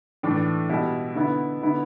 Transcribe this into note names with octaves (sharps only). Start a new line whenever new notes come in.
A2 E3 A3 D4
B2 G3 E4
D3 B3 E4
D3 B3 E4